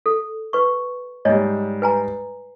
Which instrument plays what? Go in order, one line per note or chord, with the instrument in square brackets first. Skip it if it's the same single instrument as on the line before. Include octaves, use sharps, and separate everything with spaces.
[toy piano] A4
B4 C#6
[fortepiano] G#2 G3 [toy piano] C#5 D#5
[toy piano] B4 G#5 A#5